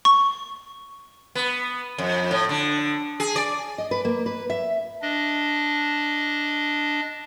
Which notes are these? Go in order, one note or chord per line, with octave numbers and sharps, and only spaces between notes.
C#6
B3
F2
A2
D3
G#4
D5
D#5
B4
A#3
B4
E5
D4 D#5